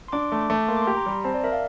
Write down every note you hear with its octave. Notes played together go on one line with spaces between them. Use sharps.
C6
D4 D6
A3
D6
A3
A#3 C6
D6
C6
G4
A#5
G3
A#5
C4 A5
D5
A#4 E5
F5